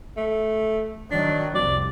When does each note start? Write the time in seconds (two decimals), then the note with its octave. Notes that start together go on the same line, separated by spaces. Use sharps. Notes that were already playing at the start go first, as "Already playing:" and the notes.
0.17 A3
1.11 D#3 F#3 D4
1.55 C2 F2 D5